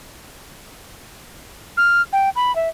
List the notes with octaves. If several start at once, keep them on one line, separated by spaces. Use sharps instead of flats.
F6
G5
B5
E5